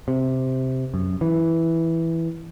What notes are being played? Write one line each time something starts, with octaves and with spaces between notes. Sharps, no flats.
C3
F#2
E3